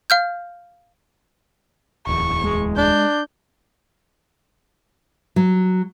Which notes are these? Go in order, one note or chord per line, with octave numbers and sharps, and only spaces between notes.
F5 F6 G6
D1 E2 C#6
G#3
D4 G6
F#3